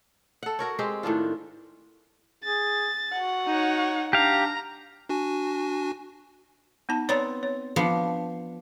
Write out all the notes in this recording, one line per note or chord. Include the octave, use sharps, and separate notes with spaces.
A4 F#5
F#4 A#4 C#5
G#3 C4 G4
A2 D#3 D4 F4
G#4 A6
F#4 F#5
D#4 C#5
D4 G4 F5 A#5
D4 F#4 G#5
B3 D#4 A5
B3 C4 C#5 D5 A#5
C#5
F3 B3 D4